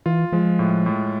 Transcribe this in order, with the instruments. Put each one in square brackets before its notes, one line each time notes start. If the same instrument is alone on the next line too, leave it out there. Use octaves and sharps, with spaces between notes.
[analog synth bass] E3 [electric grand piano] F4
[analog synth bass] F3 [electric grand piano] G#3
[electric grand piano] A2
A2